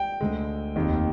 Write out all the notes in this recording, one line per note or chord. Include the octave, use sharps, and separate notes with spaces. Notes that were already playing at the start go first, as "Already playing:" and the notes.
Already playing: G5
D2 D3 G#3
F1 D#2 D#3